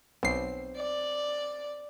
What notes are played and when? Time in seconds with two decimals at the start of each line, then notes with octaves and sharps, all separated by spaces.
0.23 B1 C4 C7
0.76 D5